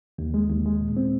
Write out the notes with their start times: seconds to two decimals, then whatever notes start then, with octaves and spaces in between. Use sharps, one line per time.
0.18 D#2
0.34 G#3
0.49 D#2
0.66 G#3
0.81 A#2
0.97 C4